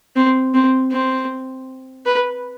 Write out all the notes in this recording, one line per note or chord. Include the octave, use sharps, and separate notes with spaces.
C4
C4
C4
B4